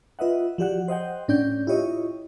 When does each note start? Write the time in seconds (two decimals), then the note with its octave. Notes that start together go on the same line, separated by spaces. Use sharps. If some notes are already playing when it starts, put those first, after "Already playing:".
0.19 F4 B4 D#5 E5 F#5
0.58 F3 F#4 G4 D5 F#5 F#6
0.88 C5 D#5 F#5 G5
1.28 A2 C#4 D4 D5 G6
1.67 E4 F4 G4 C#5 D#5